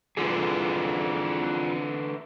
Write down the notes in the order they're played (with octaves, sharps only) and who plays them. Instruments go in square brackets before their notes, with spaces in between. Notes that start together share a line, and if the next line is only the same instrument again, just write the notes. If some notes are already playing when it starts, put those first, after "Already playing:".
[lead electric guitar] D3 E3 [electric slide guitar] C4 F4 G#4